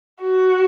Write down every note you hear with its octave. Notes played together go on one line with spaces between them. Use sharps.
F#4